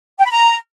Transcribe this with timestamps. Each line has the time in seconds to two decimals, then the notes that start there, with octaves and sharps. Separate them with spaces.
0.18 G5
0.24 B5
0.31 A#5